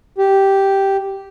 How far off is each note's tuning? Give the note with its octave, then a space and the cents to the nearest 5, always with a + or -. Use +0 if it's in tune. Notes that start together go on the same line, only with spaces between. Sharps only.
G4 -5